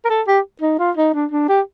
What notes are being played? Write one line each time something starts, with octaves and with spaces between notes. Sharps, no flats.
A#4
A4
G4
D#4
F4
D#4
D4
D4
G4